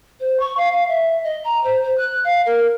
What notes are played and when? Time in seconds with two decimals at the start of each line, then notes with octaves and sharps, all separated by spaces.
0.20 C5
0.40 C#6
0.57 F5
0.72 F5
0.88 E5
1.23 D#5
1.44 A#5
1.64 C5
1.83 C5
1.97 F#6
2.24 F5
2.46 A#4